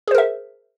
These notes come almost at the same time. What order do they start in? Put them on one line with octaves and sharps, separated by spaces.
G#4 C5 A#4 E5